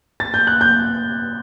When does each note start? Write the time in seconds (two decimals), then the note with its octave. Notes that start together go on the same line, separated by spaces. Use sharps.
0.20 A6
0.34 G6
0.47 F#6
0.61 G6